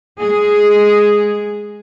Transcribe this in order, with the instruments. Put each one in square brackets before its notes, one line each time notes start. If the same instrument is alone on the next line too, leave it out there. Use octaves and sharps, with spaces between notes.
[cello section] G#3 G#4